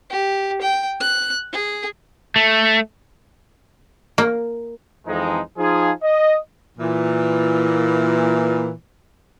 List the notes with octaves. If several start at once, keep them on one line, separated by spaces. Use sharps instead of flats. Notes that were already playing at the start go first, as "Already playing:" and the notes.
G4
G5
F#6
G#4
A3
A#3
F2 E3 G#3 D#4
F3 D#4 F4 G#4
D#5
A#2 E3